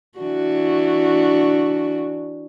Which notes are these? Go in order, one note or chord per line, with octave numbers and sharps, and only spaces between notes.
E3 D4 F#4